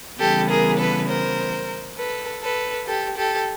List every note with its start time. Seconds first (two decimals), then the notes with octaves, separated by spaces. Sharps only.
0.19 C#3 E3 G3 B3 G4 A4
0.49 G#4 A#4
0.79 A4 B4
1.08 A#4 C5
1.98 A4 B4
2.43 A4 B4
2.87 G4 A4
3.17 G4 A4